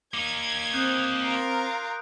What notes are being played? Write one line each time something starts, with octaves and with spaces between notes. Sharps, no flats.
A#3 D#4 D6 G#6
C4 D#6 F#6 G6
F4 A#4 D7